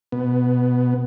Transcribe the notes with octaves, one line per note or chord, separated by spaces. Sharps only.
B2 B3